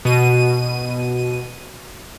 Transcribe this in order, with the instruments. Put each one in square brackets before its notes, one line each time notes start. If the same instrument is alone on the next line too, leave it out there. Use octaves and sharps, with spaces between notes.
[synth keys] B2 D#7